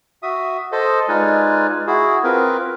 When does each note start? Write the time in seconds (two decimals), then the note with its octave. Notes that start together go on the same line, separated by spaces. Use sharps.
0.23 F#4 E5 D#6
0.72 A4 C5 D#5
1.08 G#3 D#4 F4 B4 D5 G#5
1.87 E4 F#4 G#4
2.24 C4 F4 A#4 B4